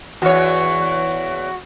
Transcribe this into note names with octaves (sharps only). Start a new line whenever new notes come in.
E2 F#4 C#5